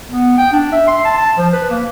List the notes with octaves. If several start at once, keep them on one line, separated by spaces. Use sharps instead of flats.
B3
G5
D4
E5
C6
A5
A5
F3
B4
A#3